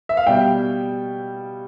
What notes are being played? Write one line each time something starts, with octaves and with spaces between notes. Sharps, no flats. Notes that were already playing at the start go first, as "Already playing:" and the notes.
E5
F5
B2 G3 G5